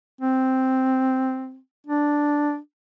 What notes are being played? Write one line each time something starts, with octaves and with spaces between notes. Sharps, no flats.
C4
D4